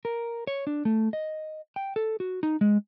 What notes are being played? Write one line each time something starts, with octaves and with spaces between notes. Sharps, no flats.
A#4
C#5
D4
A3
D#5
G5
A4
F#4
D#4
G#3